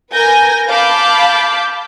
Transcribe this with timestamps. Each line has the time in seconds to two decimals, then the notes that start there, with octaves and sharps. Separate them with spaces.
0.13 A#4 B4 G#5 G6 A#6
0.68 F5 A5 B5 D6 G6